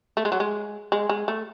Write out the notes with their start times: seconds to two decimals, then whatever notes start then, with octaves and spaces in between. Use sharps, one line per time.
0.17 A3
0.25 G#3
0.32 F#3
0.40 G#3
0.92 G#3
1.09 G#3
1.28 A3